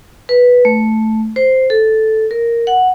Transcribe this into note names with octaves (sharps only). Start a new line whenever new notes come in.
B4
A3
C5
A4
A#4
F#5